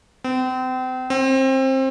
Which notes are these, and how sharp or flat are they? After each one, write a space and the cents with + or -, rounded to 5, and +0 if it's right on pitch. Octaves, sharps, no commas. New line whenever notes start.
C4 -35
C4 +25